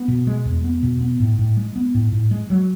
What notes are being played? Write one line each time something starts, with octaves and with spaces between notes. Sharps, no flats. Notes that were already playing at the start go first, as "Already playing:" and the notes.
Already playing: B3
B2
G#3
E2
B3
B2
B3
A2
A2
G#3
B3
A2
A2
G#3
F#3